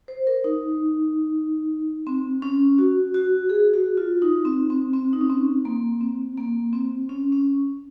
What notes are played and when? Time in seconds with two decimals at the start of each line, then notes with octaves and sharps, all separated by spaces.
0.08 C5
0.27 A#4
0.44 D#4
2.07 C4
2.42 C#4
2.78 F#4
3.14 F#4
3.50 G#4
3.74 F#4
3.97 F4
4.22 D#4
4.45 C4
4.70 C4
4.93 C4
5.13 D#4
5.21 C#4
5.30 C4
5.65 A#3
6.01 C4
6.37 A#3
6.73 C4
7.09 C#4
7.32 C#4